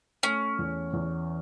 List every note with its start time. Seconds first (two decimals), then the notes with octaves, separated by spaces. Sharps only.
0.23 A3 C#4
0.58 E2
0.93 E2